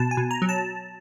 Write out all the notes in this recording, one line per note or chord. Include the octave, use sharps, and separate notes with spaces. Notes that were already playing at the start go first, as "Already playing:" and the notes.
Already playing: B2 A5
G#5
B2
A#5
F#3
A5